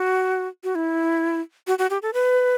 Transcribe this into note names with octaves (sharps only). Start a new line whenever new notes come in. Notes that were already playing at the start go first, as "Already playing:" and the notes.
Already playing: F#4
F#4
E4
F#4
F#4
G4
A4
B4